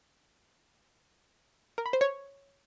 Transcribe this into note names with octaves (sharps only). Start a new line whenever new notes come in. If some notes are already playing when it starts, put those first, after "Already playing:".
A#4
B5
C5
C#5